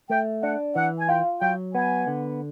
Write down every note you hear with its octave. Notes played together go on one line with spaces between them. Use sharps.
A3 G5
D4 F#5
E3 F#5
G#5
F4 G5
F#3 G5
B3 G#5
D3